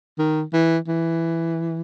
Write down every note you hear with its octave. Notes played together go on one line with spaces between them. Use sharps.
D#3
E3
E3